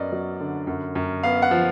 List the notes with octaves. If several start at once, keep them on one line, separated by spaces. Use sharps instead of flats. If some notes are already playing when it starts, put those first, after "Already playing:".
Already playing: F#2 B3 D5 D#5
F#3
D3
F#2
F#2
B3 F5
F#5
F3